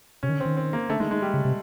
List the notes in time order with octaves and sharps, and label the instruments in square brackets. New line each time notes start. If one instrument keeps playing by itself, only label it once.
[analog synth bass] C3 [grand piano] C#4
[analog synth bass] D#3
D3
[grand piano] C4
[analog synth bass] D#3
[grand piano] C4
A#3
[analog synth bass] D3 [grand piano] A3
[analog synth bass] D#3 [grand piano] G#3
[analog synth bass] D#3 [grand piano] G#3
[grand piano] G3
[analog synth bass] C#3
C3